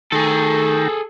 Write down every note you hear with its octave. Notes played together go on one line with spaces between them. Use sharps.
D#3 A3 G#4 A4 G5 A#5